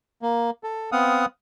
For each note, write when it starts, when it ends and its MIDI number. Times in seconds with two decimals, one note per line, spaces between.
0.22 0.50 58
0.64 0.90 69
0.92 1.26 59
0.92 1.26 60
0.92 1.26 77
0.92 1.26 78
0.92 1.26 87